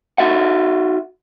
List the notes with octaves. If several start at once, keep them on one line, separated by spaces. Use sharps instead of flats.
D#4 F#4 E5 F#5